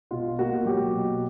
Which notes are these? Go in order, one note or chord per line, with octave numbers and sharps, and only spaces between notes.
B2 F4
A#3 F#4
F#3 G4
B2